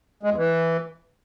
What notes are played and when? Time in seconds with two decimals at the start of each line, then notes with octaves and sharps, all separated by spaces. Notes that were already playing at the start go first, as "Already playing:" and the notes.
0.23 G#3
0.30 E2
0.37 E3